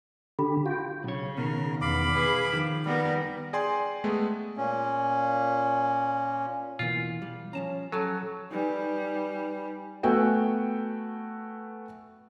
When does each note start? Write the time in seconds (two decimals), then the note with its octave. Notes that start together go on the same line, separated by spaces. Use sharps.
0.39 D3 G4 A4 B5
0.66 F4 F#4 G5
1.04 B1 C#3 C#5
1.38 B2 D#3 A#4
1.81 E2 F5 B5 D6
2.12 G#4 B4
2.53 D#3 F3
2.85 G3 B3 A#4
3.53 G#4 D5 G5 G#5 C6
4.04 G#3 A3 B3 G#4
4.57 A#2 C#4
6.79 B2 E3 A#3 F4
7.22 G3
7.53 F3 C#4 A5 A#5
7.92 F#3 A4 C#5 G#5 A5
8.51 G3 D#4 B4 G#5
10.03 A3 B3 F#4 G5 G#5